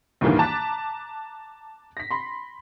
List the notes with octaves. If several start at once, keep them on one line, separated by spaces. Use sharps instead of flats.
D2 G2 A#2 D#3 E3 A#3
A5 A#5 D6 F#6 A6 B6
A#6 B6
B5 C6